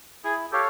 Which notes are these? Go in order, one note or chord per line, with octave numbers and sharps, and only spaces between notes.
E4 G#4
G4 A4 C#5 F5